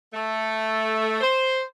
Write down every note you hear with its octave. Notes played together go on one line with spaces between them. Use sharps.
A3
C5